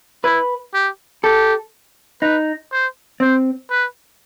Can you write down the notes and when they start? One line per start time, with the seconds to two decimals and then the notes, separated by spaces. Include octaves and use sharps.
0.24 E4 B4
0.74 G4
1.24 G4 A4
2.22 D#4 B4
2.72 C5
3.20 C4 C5
3.70 B4